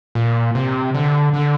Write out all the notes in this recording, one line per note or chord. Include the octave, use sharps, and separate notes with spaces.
A#2
C3
D3
D3